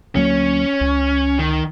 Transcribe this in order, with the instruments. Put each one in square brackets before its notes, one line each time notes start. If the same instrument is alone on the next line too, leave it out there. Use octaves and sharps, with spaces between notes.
[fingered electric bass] D2 F#3 A#3 [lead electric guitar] C#4
[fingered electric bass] C#2
[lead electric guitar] D#3